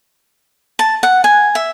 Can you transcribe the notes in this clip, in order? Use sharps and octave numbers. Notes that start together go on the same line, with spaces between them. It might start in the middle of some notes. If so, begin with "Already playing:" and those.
A5
F#5
G#5
E5